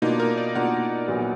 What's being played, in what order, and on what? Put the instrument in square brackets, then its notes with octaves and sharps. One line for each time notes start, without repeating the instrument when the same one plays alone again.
[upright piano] B2 A#3 D4 F4 [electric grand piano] D#4
[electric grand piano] A#4
D5
[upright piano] B2 A#3 D4 F4 [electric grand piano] F#5
[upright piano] A#1 A#2 F#3 B3